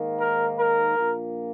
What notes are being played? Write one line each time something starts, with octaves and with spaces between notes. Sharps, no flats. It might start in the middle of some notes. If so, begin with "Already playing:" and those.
Already playing: G#2 D#3 A#3
A#4
A#4
A#1 A#2 A#3